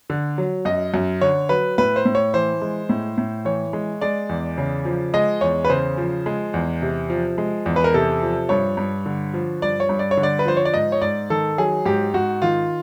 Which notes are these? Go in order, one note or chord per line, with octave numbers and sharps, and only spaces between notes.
D3
F#3
F#2 D#5
F#2
D3 C#5
F#3 B4
A2 B4
C5
A2
C#5
E3 C5
G#3
A2
A2
E3 C#5
G#3
G#3 D5
E2
C#3
F3
G#3 D#5
E2 C#5
B4
C#3 C5
F3
G#3
E2
C3
F3
G#3
E2
B4
A#4
C3 A4
F3
G2 C#5
G2
D3
F3
G2 D5
C#5
G2
D5
C#5
D3
D5
B4
F3 C5
C#5
D5
G#2 D#5
C#5
G#2 D5
D#3 A4
F#3 G#4
G#2 G4
G#2 F#4
D#3 F4